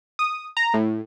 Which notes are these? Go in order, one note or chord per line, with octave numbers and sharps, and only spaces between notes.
D#6
A#5
A2